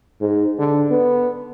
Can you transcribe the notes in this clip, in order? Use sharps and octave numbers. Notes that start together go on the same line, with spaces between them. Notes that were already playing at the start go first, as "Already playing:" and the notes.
G#2
D3
B3